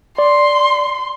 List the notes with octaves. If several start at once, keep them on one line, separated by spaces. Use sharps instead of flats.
D5 C6